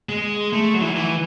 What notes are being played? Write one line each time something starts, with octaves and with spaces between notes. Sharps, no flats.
G#3
A3
F#3
E3
F#3
E3